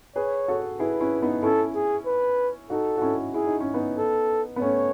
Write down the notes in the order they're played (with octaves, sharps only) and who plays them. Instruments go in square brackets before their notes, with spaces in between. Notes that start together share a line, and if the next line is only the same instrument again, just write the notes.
[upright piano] G#4 B4 [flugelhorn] C#5
[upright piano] F#4 A4
[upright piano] E4 G#4 [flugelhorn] B4
[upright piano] C#4 E4
B3 D#4
[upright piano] C#4 E4 [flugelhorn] A4
[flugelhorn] G#4
B4
[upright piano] D#4 F#4 [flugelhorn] A4
[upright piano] F#4
C#4 E4
[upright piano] E4 [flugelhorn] G#4
[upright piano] D#4
C#4
B3 D#4
[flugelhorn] A4
[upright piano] B3
[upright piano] A3 C#4 [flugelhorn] C#5